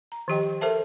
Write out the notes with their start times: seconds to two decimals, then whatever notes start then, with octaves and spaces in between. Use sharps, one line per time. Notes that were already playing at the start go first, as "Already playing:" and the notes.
0.12 A#5
0.28 D#3 F3 G4 D#5 G5
0.61 A4 A#4 C5 E5 A5